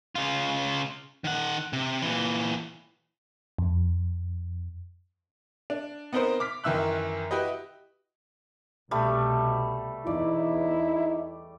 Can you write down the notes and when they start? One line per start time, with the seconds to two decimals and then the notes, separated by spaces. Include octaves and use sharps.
0.15 C#3 F4
1.24 D#3 F#5
1.73 C3
2.02 A#2 E3
3.58 F2
5.70 D4
6.13 B3 C4 D#4 A#4 C5
6.40 D6 F6 B6
6.64 F#2 D#3 E3 E5 E6 F#6
7.31 E4 F#4 G4 B4 D#5
8.91 C2 B2 G3 A3
10.07 E2 D#4 E4 D5